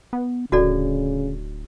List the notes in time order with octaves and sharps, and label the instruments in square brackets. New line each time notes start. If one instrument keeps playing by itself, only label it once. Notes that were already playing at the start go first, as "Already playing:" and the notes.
[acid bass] B3
[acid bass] D1 [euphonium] C#3 [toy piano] F#4 A4 D5